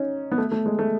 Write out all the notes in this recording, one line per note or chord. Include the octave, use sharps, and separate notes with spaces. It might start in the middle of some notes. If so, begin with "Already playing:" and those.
Already playing: C#4 D#4
B3
A3
A3
G#3
A3